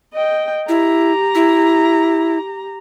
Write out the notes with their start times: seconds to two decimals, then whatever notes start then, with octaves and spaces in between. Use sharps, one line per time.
0.13 D#5 G5
0.69 E4 G4 A#5
1.35 E4